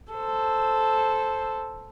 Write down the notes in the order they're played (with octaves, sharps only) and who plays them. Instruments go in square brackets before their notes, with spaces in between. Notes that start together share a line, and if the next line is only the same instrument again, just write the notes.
[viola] A4 C5